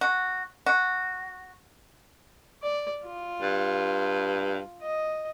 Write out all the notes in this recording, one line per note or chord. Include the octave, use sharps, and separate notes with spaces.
F#4
F#4
D5
F4
G2
D#5